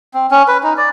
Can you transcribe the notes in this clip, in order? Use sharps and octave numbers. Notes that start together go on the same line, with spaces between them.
C4
C#4
B4
D#4
D5